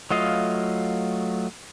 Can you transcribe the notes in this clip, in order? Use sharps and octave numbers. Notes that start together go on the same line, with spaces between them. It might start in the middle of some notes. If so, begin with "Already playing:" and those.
F#3 A3 F4 D#5 F5